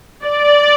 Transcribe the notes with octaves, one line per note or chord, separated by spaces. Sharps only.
D5